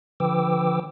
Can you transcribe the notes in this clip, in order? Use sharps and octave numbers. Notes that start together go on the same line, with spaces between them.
D3 F3 B4 G5 D6 E6